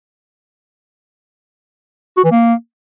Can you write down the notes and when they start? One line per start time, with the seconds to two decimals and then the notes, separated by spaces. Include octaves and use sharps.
2.17 F#4
2.24 E3
2.31 A#3